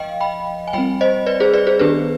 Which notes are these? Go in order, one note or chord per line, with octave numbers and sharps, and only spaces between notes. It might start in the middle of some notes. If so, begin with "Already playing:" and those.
Already playing: F3 D#5 F5 G5
G5 B5
G#5
G3 C4 G5 B5
C5 D#5
B4 D5
G#4 C5
B4 D5
G#4 C5
D#3 B3 D4 G4 B4